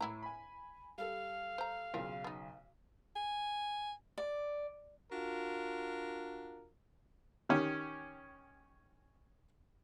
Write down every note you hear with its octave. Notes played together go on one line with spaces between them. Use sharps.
A2 E3 E4 A#5
G#5 B5
G3 A4 F5
C5 A#5
B1 C#3 C4 F4 A#4
B3 D#4
G#5
D5
D4 F4 F#4 A#4
D#3 C#4 G4